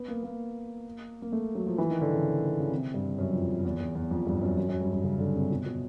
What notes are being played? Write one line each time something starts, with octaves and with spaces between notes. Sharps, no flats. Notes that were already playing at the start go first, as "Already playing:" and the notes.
Already playing: B3
A#3
A#3
A#3
A3
F#3
F3
E3
D#3
D3
C#3
C#3
C3
G2
F#2
F2
E2
E2
E2
F2
G2
F#2
F#2
F#2
G2
G2
C#3
D3
C3
B2
B2